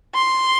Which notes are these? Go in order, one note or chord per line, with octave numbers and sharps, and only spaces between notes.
C6